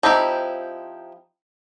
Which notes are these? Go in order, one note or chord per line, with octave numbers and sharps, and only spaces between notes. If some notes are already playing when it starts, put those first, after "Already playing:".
F3 C4 D#4 E4 G4